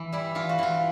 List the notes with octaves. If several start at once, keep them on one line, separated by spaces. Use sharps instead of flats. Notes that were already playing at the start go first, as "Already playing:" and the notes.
Already playing: E3
G3 E4
E3 F4
F#4
E3 F4